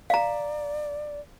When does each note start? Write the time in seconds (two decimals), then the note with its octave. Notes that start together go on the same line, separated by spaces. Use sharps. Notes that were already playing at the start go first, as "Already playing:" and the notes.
0.10 D5 F5 A#5